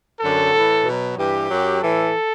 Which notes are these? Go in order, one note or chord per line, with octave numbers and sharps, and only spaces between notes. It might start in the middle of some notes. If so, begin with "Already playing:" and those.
F#2 D3 F#3 A4
A2 E3
B2 F#3
G2 E3 G4
F#2 F#3
A2 E3 A4